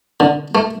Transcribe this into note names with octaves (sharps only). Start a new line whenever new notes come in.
D3
A3